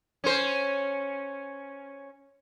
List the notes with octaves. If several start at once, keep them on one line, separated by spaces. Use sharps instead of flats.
C#4 C5